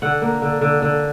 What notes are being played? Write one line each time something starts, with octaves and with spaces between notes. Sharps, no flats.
D3 F#5
A#3
D3
D3
D3